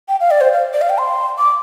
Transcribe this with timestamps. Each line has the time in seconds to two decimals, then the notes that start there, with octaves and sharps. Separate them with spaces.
0.08 G5
0.20 F5
0.31 D5
0.41 C5
0.53 F5
0.73 D5
0.81 F5
0.89 G5
0.98 C6
1.38 D6